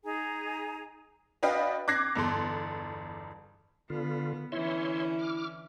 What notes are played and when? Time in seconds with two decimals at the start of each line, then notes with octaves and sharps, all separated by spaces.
0.04 D#4 G#4 G#5 A#5
1.43 D4 F#4 B4 D#5 F5 G5
1.88 D6 F#6 G#6 A#6 C7
2.15 G1 E2 A4 C6
3.90 D3 B3 F4
4.52 D3 E3 C#4 E4 C#5 E5 C6
5.19 D6 F6